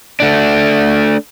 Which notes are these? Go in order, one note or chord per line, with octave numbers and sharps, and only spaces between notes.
A3 D4